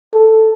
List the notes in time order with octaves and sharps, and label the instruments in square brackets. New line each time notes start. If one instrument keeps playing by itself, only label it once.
[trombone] A4